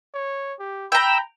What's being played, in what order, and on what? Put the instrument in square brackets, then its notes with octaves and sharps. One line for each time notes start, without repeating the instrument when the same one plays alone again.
[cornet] C#5
G4
[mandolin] G5 A#5 [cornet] B5 [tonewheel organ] E6